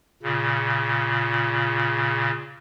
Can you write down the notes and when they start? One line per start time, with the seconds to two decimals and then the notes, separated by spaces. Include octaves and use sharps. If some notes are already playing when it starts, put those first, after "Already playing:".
0.23 A#2 C#3